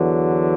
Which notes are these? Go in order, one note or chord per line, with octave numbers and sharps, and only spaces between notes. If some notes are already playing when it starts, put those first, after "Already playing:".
Already playing: E2 D3 F#3